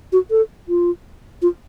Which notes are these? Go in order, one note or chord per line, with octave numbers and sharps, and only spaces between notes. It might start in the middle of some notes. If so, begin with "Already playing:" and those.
F#4
A4
F4
F4